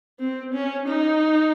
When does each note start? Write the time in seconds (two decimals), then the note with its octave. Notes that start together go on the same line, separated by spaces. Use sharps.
0.20 C4
0.54 C#4
0.88 D#4